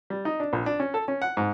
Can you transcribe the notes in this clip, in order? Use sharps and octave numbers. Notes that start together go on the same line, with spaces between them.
G3
D#4
D4
A#1
D4
C#4
A4
C#4
F#5
G#2